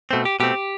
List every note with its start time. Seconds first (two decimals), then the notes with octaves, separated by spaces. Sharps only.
0.11 B2 A3 C4
0.25 G4
0.40 B2 A3 C4 G4